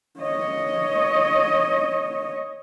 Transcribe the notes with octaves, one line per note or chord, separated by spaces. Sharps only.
C#5 D#5